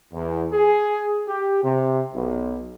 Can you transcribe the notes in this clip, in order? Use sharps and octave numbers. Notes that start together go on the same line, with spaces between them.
E2
G#4
G4
C3
B1